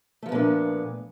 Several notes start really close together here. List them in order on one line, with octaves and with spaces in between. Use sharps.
A3 F3 B3 A#2 D4